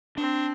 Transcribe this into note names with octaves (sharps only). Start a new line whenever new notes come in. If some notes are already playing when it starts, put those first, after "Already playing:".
C4 D4